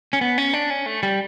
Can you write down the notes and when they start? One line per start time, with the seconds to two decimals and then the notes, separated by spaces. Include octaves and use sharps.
0.13 C#4
0.21 B3
0.38 C#4
0.54 D4
0.70 C#4
0.86 A3
1.03 G3